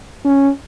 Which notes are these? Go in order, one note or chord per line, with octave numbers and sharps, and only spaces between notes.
C#4